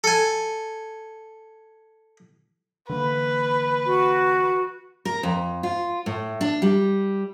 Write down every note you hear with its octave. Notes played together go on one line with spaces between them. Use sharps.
A4 G#5
D3 E3 A#3 B4
F#4
A#4
F2
F4
A2
D4
G3